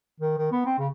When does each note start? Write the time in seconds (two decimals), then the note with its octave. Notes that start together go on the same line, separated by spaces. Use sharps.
0.20 D#3
0.38 D#3
0.51 B3
0.66 C4
0.78 C#3